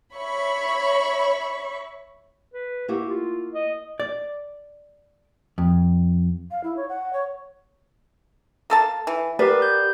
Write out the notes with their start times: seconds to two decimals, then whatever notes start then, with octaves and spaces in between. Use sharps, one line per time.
0.16 C#5 E5 B5 C#6
2.54 B4
2.88 A#3 E4 F#4 G4
3.09 F4
3.54 D#5
4.00 D5
5.58 F2
6.51 F5
6.64 E4
6.76 C#5
6.89 F#5
7.13 C#5
8.70 A#3 A4 A5
9.07 E3
9.39 B3 G4 A#4 B4 D5
9.62 G6